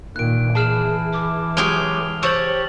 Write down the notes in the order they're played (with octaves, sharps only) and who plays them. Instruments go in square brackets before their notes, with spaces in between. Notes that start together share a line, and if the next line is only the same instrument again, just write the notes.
[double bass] A#2 D#3 [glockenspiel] F#6 D7
[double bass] E3 [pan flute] G#4 [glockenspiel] A5 F6 E7
[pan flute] D6
[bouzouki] F#3 G#3 G4 [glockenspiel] F6 F7 G7
[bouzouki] G4 C#5 [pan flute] C5 [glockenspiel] E6 A6 F#7